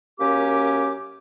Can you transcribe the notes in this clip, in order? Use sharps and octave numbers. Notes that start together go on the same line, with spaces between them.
F#2 A#3 C#4 G4 D6